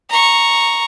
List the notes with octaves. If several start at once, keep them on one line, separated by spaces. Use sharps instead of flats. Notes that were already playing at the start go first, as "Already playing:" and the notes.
A#5 C#6